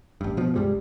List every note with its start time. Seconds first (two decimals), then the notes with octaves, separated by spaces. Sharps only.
0.21 A1 G2
0.37 B2 F3
0.55 C2 G2 G3 G#3